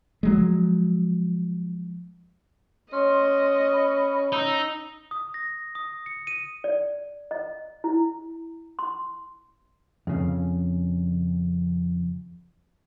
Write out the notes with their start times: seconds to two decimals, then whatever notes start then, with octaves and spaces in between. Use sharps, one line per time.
0.23 F3 F#3 G#3
2.93 C#4 D#5 C6
3.73 B5
4.33 D#4 E6
5.11 D#6
5.34 A#6
5.75 D#6
6.06 C#7
6.27 D#7
6.64 D5
7.31 D#5
7.84 E4
8.79 C6
10.07 F2 C#3